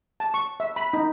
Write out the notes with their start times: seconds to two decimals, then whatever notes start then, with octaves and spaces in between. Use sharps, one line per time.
0.20 A5
0.34 C#6
0.60 E5
0.76 B5
0.93 D#4